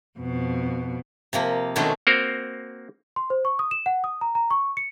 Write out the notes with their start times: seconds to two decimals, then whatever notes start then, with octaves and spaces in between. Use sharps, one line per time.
0.19 F2 B2
1.33 C3 F3 A#3
1.76 B2 D#3 G#3 A3 C#4 D4
2.07 A#3 C4 F#4 A#4 C5
3.16 C6
3.30 C5
3.45 C#6
3.59 D#6
3.71 E7
3.86 F#5
4.04 D#6
4.21 A#5
4.35 A#5
4.51 C#6
4.77 C#7